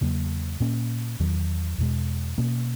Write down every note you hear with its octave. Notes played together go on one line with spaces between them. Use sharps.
E2 C#3 F#3 A#3
A#2 A#3 C#4
E2 D#3 F#3
E2 B2 G#3
B2 A#3 C#4